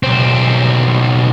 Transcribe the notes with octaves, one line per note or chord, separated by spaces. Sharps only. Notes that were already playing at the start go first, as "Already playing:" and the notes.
B1 C4